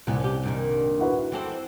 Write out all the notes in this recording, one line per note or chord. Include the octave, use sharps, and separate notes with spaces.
C2 A#2 B3
C#4 G4
G2 A#2 D#3
E4 F#4 B4
E3 C4 A4